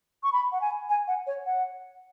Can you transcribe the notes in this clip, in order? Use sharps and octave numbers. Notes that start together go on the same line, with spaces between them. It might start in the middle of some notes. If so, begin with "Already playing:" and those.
C#6
B5
F#5
G#5
G#5
F#5
C#5
F#5